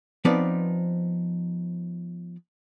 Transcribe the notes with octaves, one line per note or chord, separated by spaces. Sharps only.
F3 B3 C4 D#4 B4 D5